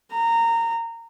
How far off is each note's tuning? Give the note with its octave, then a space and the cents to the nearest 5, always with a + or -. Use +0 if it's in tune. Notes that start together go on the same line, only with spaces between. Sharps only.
A#5 -20